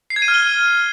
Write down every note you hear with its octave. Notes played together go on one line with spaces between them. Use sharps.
C7
G#6
D#7
F6
G7